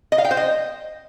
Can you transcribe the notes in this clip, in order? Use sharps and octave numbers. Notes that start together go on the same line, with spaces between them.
D#5
F5
G5
C5
D#5